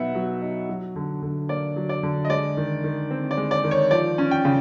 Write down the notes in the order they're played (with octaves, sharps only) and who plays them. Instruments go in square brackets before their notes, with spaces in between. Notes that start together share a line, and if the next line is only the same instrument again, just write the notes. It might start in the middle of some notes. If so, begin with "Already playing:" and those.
Already playing: [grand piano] B2 F#3 B3 D#4 E5 F#5
F#3
D#4
F#3
D3
D3
A#3 D5
F#3
D5
D3
D#5
G#3 D5
D#3
D#3
C4
D5
G#3
D5
D#3
C#5
F3 D5
C#4
G5
C#3